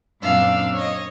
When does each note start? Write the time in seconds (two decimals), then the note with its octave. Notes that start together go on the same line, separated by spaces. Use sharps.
0.22 F#2 A#2 C4 D4 F5 E6
0.74 C#5 D#5